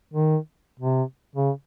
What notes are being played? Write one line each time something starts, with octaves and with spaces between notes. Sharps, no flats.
D#3
C3
C#3